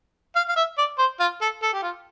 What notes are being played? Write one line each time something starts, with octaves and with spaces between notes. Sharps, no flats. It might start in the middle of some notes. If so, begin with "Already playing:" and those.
F5
F5
E5
D5
C5
F4
A4
A4
G4
F4